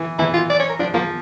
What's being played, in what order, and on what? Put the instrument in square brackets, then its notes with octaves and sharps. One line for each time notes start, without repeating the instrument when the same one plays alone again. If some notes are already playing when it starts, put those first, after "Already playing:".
Already playing: [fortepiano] E3
[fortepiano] E3 [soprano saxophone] E4
[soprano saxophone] F4
D5
C#5
A#4
[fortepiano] F3 [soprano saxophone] D4
[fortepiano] F3 [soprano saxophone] A#3